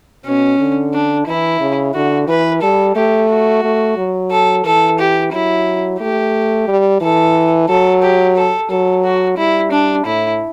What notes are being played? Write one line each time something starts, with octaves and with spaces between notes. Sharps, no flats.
B2 C#4
D3
D4
E3 E4
C#3
D3 F#4
E3 B4
G3 A4
A3 G4
F#4
A3
F#3
A4
E3 A4
G4
F#3 E4
A3 G4
G3
E3 A4
F#3 A4
G4
A4
F#3 A4
F#4
G3 E4
D4
A2 E4